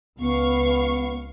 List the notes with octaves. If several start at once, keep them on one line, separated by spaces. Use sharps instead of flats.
C#2 B3 F5 C#6